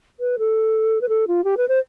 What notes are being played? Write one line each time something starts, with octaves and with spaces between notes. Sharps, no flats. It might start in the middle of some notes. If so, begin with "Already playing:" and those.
B4
A4
B4
A4
F4
G4
B4
C5